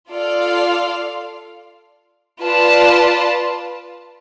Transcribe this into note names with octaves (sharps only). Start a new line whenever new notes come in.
F4 A4 D5 F5
F4 B4 D5 A5